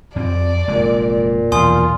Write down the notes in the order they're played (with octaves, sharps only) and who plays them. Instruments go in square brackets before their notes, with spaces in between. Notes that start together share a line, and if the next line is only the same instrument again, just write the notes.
[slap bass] F2 C4 [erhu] D5
[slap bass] F1 G#3 [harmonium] A#2
[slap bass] B1 E2 F3 [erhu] F4 [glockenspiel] G#5 C6 D#6